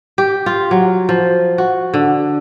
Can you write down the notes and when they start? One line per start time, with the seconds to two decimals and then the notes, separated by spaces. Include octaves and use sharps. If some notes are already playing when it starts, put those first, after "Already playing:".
0.18 G4
0.46 F4
0.71 F#3
1.09 F3
1.58 F#4
1.94 D3